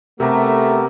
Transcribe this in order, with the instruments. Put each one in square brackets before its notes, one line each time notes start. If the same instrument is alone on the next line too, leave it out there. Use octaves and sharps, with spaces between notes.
[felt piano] C3 A#5 [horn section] A3 [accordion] B3 G4 A#4